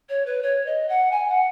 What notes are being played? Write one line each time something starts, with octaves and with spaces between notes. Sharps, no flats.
C#5
B4
C#5
D#5
F#5
G#5
F#5